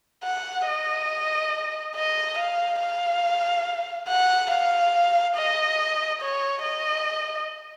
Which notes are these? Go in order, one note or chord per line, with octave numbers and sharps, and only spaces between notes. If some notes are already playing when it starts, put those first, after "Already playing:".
F#5
D#5
D#5
F5
F5
F#5
F5
D#5
C#5
D#5